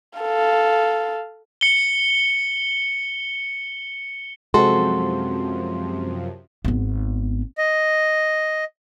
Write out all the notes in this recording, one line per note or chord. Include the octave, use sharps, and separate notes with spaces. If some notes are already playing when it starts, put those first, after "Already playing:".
A4 F5
C#7 G7
F#2 C3 F3 G#3 C4 F#4 A4 C6
G#1 B3
D#5